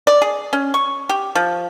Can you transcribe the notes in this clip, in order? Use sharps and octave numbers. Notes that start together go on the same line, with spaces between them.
D5
G#4
C#4
C#6
G4
F3